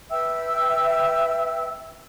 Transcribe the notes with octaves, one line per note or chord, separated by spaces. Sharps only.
B4 E5 G5 E6